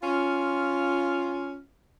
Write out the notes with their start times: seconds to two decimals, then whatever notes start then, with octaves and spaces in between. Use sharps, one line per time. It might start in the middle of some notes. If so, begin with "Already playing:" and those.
0.03 C#4 F4